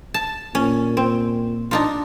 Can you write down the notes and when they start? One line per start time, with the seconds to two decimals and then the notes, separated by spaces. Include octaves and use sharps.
0.14 A5
0.55 A#2 C#4
0.97 C4
1.71 D4 D#4 F4